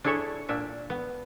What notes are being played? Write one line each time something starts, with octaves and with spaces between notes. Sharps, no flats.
D4 E4 G#4 A4 C#5 E5
A#2 D4 E5
B3